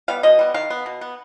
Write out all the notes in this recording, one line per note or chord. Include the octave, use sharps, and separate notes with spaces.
G3 B3 F5
B2 D#5
G3 B3
D#3 F5
B3
B2
B3